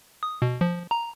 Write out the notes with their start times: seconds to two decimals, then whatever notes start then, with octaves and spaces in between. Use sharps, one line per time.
0.23 D#6
0.42 B2
0.61 F3
0.91 A#5